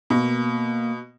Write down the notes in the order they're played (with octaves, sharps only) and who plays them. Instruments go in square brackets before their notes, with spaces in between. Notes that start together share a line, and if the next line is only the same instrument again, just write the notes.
[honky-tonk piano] B2 [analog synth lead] A#3